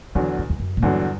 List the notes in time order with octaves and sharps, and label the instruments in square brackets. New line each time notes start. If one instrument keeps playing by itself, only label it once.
[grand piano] E2 D3 F#3 [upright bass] E3
[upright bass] F#2
E2
F#2
A#2
[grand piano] E2 D3 F#3 [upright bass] G2